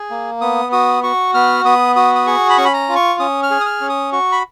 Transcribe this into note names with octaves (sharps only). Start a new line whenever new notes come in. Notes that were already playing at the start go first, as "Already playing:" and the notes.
Already playing: G#4
A#3
B3 D#6
F#4 D#6
F#4 C#6
B3 F6
B3 D#6
F#4 D#6
D#6
G#4 C#6
B5
C#4 C#6
B5
A#5
F4
C#6
C#4 D#6
F6
G#4
D#6
F6
C#4
D#6
F#4 C#6
B5